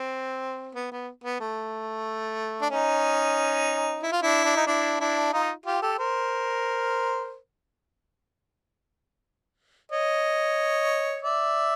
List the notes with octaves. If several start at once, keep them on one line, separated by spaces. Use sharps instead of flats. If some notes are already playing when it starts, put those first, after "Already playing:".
Already playing: C4
B3
B3
B3
A3
D4
C#4 D#4
E4
F4
D4 E4
D4
D#4
D4 E4
D4 E4
D#4 F4
F4 G4
G4 A4
A#4 C5
C#5 D#5
D5 E5